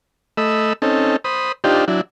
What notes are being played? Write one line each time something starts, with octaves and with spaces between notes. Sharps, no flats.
A3 D#5 B5 E6
C4 C#4 D#4 A4
C5 B5 D#6
D4 D#4 F4 G4 C5
F#3 D4 E4